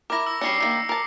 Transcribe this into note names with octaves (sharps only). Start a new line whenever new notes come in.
E4 A#4 D6 A#6
E6
G3 C#4 D4 C7 C#7
D#3 A3 A#3
A#4 A5